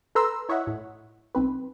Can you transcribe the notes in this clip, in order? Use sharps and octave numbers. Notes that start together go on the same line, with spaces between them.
A4 B4 A#5 C6 E6
E4 C#5 D#5 E5 F#5
A2
B1 C4 B4